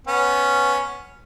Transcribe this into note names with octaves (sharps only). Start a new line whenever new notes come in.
B3 C#4